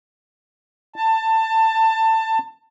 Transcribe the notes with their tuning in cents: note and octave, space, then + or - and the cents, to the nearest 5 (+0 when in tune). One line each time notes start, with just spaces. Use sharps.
A5 +20